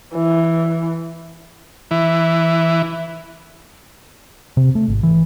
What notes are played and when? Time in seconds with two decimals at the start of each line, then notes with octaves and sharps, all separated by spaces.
0.15 E3
1.91 E3
4.57 C3
4.75 A3
4.88 G#1
5.03 E3